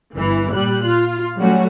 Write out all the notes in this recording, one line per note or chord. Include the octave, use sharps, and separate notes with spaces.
G1 E3
A#2 G3 F#6
F4
F#3 G3 A3 C#4 F#4